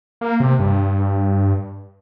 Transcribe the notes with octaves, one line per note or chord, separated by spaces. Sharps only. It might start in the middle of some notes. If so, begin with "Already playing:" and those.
A#3
C3
G2